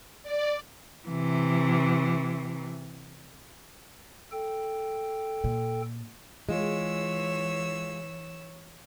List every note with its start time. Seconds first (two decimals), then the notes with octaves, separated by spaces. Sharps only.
0.23 D5
1.08 C3 E3
4.32 A4 G5
5.44 A#2
6.49 E3 G#3 F4 C#5 E6